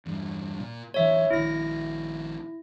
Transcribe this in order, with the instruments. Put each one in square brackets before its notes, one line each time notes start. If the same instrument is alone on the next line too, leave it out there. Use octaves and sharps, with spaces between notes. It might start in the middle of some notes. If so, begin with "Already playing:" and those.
[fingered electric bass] E2 G2
A#2
[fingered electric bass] D1 E3 [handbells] C#5 E5
[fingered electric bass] A#1 D#3 [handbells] E4 A#6